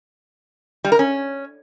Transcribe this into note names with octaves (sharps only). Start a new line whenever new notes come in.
G3
A#4
C#4